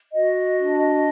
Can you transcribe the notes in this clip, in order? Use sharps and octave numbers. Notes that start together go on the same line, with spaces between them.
F#4 D#5
D4